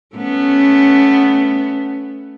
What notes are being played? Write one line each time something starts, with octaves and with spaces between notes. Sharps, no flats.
A3 B3 C#4